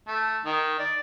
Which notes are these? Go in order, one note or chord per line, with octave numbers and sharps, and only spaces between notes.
A3
D#3
D5